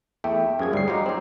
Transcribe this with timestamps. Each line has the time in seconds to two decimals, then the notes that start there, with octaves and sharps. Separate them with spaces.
0.24 E2 A3 E5 G5
0.59 F#2 F3 C#4 G#4 G#6
0.73 D2 G#2 G3 C7
0.88 F#3 F4 G4 D#5 A#5 D6
1.06 C4 D#4